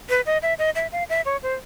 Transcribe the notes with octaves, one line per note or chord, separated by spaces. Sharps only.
B4
D#5
E5
D#5
E5
F5
E5
C#5
C5